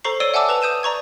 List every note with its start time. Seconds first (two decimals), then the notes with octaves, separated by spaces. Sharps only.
0.04 A4 C5 A#5 C#6 C7
0.20 C#5 D5 E6 D7 D#7 G7
0.34 E5 F#5 G#5 A5 D6 E6
0.49 B4 A5 F7
0.62 D#6 G6 D#7 E7
0.83 D5 A#5 C#6 G#6